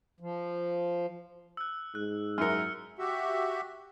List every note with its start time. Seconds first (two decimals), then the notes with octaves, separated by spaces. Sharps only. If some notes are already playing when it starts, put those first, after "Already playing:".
0.20 F3
1.57 E6 F#6
1.95 G#2 F#6
2.38 F#2 E4 A#4 F6 C#7
2.99 F#4 G4 E5